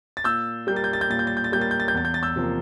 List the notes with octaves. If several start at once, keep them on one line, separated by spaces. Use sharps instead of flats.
A6
A#2 E6 G6
G3 A#3 G6
A6
G6
A6
G6
A#2 A6
G6
A6
G6
A6
G3 A#3 G6
A6
G6
A6
G6
E2 A6
G6
A6
E6 G6
C3 F3 A#3